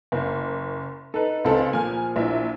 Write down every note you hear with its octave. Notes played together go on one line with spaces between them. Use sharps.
F#1
D#4 A4 B4
C#2 C4 A4
A#2 F3 A#3 G#5 F6
A#1 E4 E5